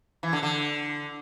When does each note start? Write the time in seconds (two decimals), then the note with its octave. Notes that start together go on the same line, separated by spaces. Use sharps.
0.23 E3
0.33 D3
0.43 D3